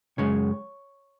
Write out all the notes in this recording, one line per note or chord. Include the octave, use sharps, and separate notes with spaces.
F#2 C#3 G#3 C#4 C#5